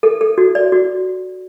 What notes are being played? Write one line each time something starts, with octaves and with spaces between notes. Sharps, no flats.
A4
A4
F#4
D5
F#4